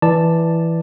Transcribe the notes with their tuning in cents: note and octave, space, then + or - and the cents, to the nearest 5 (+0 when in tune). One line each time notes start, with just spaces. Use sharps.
E3 +0 D5 +5 A5 +0